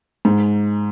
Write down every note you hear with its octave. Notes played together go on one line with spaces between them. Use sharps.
G#2